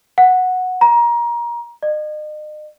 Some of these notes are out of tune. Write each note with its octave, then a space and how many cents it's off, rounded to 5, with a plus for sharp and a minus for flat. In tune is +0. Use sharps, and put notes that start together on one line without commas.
F#5 -10
A#5 +25
D#5 -40